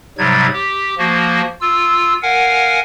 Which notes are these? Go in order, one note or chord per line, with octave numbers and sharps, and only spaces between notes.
G#2 C3 F#3 G3 G#6
G4
F3 A#3 F#4
F4 E6
A#4 F5 F#5 G#5